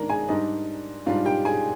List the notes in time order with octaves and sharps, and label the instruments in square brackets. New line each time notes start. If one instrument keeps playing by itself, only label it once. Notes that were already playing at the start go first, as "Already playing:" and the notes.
Already playing: [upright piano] D#3 G#3 D4 A#4 A#5
G#4 G#5
G#2 G3 D4 D#4 D#5
G#2 G3 D4 F4 F5
G4 G5
G#4 G#5